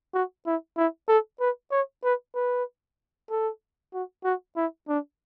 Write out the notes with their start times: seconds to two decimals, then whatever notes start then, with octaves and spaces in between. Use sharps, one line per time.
0.14 F#4
0.46 E4
0.77 E4
1.08 A4
1.40 B4
1.72 C#5
2.04 B4
2.35 B4
3.30 A4
3.93 F#4
4.24 F#4
4.56 E4
4.89 D4